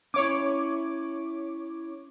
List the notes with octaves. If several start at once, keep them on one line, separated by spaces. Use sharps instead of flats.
C#4 E4 C#5 D6